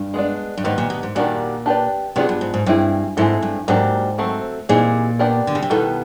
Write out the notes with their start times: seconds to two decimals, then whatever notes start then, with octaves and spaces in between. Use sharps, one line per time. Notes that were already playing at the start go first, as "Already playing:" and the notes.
Already playing: G2
0.14 G#3 B3 D4
0.58 G2
0.64 G#2 D#3 G3 B3 D#4
0.78 A#2
0.90 B2
1.03 G#2
1.15 A#2 D#3 G3 A#3 D4 F#4
1.66 D4 G4 B4 D5
2.16 C3 B3 D4 F4 G#4
2.29 G2
2.41 G#2
2.54 G#2
2.66 G2 G3 C4 E4 G#4
3.17 G#2 G#3 C4 E4 A4
3.42 G2
3.68 G#2 F#3 A#3 D4 G4 A#4
4.18 F#3 A3 C4
4.69 A#2 E3 G3 C4 D#4 G#4
5.19 B3 D4 G4 A#4 D5
5.47 D3
5.55 C#3
5.62 C3
5.70 B2 D#3 G3 B3 E4 A4